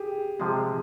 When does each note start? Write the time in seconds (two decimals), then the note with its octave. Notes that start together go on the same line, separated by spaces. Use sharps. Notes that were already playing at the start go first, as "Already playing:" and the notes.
Already playing: G4 G#4
0.40 C3 F3 G#3 G#4